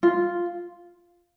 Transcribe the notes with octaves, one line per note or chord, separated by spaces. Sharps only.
F4